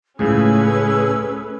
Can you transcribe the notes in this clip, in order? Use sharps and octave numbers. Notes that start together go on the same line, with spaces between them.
C#2 A2 C#3 A3 C#4 G#4 B4 E6